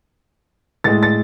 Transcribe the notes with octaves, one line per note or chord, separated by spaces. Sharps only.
A2 G#3 A6
A6